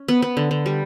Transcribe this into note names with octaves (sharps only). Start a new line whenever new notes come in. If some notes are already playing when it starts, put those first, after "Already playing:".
Already playing: C#4
B3
B3
D3
D3
G3